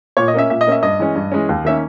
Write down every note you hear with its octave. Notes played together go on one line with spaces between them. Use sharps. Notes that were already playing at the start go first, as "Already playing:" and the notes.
A#2 C#5
D#5
A#3 C#4 E5
A#2 E5
D#5
A#3 C#4 E5
G2 D#5
E3 G#3 C#4
G2
E3 G#3 C#4
D#2
D#3 A#3 C#4 E5